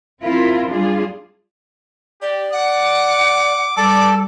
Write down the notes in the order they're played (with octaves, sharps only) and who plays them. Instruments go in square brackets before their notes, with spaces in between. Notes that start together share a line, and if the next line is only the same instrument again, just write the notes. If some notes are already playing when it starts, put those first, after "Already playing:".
[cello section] C4 E4 F4 A#4
G3 D4 F4 G#4
[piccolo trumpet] G4 [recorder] D5
[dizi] F#5 [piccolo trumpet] D6
[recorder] G3 [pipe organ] A4 [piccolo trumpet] D5 [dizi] D6